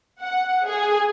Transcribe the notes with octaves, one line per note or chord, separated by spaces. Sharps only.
F#5
G#4